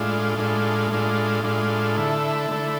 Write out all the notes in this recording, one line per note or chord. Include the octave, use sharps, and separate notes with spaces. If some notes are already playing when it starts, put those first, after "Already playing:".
Already playing: A2 G#3 D4 F4
A2 G#3 D4 F4
A2 G#3 D4 F4
A2 G#3 D4 F4
D3 A3 E4
D3 A3 E4